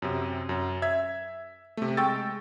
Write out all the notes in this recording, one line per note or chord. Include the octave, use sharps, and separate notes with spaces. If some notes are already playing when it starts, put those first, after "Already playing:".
F#2 C3
F#2
E5 G#6
C3 A3
G#3 G5 C#6 E6 A6